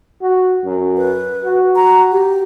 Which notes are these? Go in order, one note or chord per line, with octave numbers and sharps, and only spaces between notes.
F#4
F#2
B4
F#4
A#5
G4